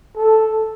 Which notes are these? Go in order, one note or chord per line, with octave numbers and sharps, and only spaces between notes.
A4